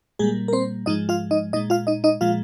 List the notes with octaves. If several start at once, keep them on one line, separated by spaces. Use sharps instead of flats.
A#2 G3 G#3 A#3 G#4
A#4
C4 C5
G#2 F3 G#3 D#4 D#5
F4 F5
D#4 D#5
A#2 G#3 D#4 D#5
F4 F5
D#4 D#5
D#4 D#5
A#2 F3 G#3 F4 F5